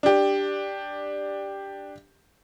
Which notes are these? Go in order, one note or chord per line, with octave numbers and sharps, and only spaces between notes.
D4 G4